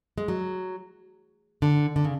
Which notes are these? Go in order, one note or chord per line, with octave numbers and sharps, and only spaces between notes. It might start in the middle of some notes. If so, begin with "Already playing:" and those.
G#3
F#3
D3
D3
C#3